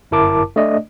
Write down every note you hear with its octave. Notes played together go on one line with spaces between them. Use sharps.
G1 F#2 E4 A#4 A5 D6
A3 D4 D5 D#5